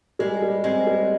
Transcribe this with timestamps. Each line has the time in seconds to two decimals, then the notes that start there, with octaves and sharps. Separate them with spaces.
0.19 G3 G#3
0.42 G3
0.64 G#3 C4
0.87 G3